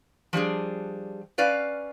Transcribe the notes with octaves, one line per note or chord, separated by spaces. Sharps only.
F3 G3 D4 G#4
C#4 B4 D5 F5